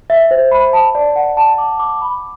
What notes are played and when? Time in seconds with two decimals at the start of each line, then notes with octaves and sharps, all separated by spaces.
0.10 E5
0.31 C5
0.51 B5
0.73 A5
0.95 D5
1.16 F#5
1.37 A5
1.58 D6
1.79 D6
2.02 B5